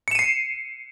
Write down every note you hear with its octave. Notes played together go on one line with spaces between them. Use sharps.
C7 C#7 D#7 E7